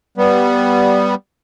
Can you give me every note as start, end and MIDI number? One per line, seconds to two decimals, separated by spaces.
0.18 1.15 55
0.18 1.15 59